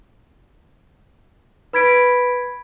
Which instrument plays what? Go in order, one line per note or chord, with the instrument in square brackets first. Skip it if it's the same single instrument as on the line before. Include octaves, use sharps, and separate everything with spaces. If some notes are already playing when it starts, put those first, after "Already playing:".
[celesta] B4 B5 G#6 B6 D7